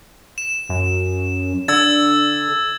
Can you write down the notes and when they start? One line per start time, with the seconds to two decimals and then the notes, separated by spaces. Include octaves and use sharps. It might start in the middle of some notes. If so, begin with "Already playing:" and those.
0.38 E7
0.69 F#2
1.68 D3 E6 G#6 A6